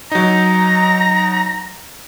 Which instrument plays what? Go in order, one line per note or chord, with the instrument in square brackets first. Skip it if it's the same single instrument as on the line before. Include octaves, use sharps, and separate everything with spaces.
[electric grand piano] F#3 D#4 [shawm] A#5